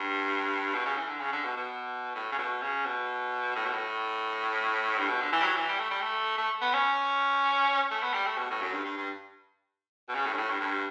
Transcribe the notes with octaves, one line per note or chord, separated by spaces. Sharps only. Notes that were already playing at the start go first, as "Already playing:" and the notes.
Already playing: G2
B2
C#3
E3
D3
C#3
D3
B2
B2
A2
C#3
B2
C#3
B2
A2
B2
A2
G2
B2
D3
E3
G3
F#3
E3
G3
A3
G3
A3
A3
B3
C#4
A3
B3
G3
A3
B2
A2
F#2
G2
G2
G2
B2
C#3
A2
G2
A2
G2
G2